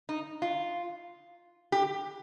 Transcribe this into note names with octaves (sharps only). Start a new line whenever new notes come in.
D#4
F4
G4